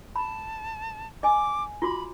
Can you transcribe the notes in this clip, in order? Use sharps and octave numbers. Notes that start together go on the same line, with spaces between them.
A5 B5
D#5 G#5 D6
F4 F#4 B5 D6